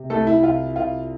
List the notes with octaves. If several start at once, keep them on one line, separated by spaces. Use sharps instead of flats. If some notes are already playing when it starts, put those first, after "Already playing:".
Already playing: C3
C2 A3 A4
E4
C2 F4
C2 F4